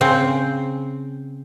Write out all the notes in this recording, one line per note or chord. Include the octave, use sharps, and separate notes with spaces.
C#3 C4